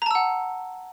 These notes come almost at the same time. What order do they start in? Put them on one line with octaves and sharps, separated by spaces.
A#5 A5 E6 F#5